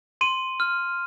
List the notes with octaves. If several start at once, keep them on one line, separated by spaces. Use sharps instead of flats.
C6 D#7
F6